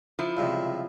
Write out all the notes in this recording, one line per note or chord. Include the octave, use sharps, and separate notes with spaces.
F3 E4
C#2 G2 C3